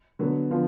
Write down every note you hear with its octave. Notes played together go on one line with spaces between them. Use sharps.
D3 F#3 B3
D3 F3 B3 F4